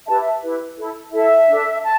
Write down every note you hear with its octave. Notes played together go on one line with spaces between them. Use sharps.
E4 G4 B4 E5 A5
E5
E4 G4 B4
E4 A4
E4 A4 E5
D4 A4
A5